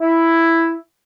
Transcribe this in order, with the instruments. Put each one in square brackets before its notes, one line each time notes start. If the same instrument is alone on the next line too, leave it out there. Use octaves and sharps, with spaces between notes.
[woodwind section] E4